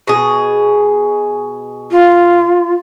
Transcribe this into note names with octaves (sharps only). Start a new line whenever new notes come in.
B2 G#4
F4